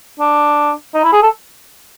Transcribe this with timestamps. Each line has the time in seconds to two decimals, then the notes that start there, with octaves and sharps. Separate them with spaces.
0.20 D4
0.94 D#4
1.04 E4
1.13 G#4
1.22 A4